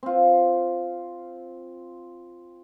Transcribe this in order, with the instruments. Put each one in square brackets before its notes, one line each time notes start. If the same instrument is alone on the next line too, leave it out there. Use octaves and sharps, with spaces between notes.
[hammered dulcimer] C4 F4